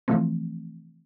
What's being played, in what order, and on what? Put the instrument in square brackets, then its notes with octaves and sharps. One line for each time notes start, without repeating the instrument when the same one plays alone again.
[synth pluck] C3 E3 F3 A3 C4